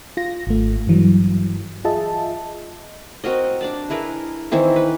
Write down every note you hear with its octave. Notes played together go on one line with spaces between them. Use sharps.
F4 A#6
G#1 A3
G2 E3 F#3
F4 G#4 D#5 E5 A5
C4 F#4 A#4 D#5
D4 D5 A5
E4 G#4 A#4 B4
D#3 E3 C4 E4
B4